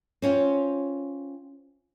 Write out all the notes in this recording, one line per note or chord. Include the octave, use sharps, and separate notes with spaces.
C4 C#4 F4